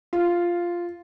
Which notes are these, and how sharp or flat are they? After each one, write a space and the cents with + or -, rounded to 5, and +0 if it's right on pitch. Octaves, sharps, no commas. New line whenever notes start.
F4 -5